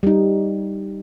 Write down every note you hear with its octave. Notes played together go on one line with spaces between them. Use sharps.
G3 D#4